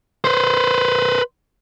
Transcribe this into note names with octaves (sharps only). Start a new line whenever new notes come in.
B4 C5